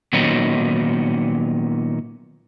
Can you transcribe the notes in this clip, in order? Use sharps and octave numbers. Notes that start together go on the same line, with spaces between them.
A#2 D#3 F#3 B3 C#4 D#4